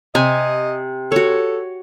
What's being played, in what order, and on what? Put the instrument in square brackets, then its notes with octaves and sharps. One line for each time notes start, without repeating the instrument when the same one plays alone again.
[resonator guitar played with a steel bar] C3 [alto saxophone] D#5 [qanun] G#5
[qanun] F#4 C#5 [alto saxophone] A4